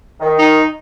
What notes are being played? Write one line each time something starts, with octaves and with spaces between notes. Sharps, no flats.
D#3
D#4